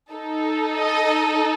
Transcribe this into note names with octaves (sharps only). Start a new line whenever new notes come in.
D#4 A4
D#5